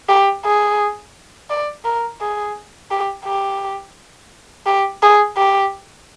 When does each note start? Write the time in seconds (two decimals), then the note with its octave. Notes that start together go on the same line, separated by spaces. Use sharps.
0.09 G4
0.45 G#4
1.50 D5
1.85 A#4
2.21 G#4
2.91 G4
3.26 G4
4.66 G4
5.03 G#4
5.37 G4